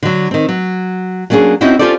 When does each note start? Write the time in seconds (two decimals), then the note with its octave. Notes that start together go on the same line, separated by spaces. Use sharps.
0.03 D3 F#3
0.31 D#3 C4
0.49 F#3
1.30 F#3 A#3 C#4 D4 G#4
1.61 C4 C#4 D#4 E4 F#4
1.79 C#4 F4 G4 A4 C5 D5